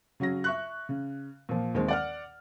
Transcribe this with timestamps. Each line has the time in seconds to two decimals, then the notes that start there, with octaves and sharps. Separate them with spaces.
0.20 C#3 F#3 C#4 A#6
0.44 E5 C#6 F#6
0.89 C#3
1.49 A#2 F3
1.74 D#2 D#3 G#3 C4
1.88 D5 F#5 F6